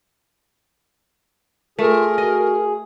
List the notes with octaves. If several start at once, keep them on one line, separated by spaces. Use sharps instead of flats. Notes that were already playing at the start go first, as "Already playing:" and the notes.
A3 F4 G#4 A#4
F#4 D#5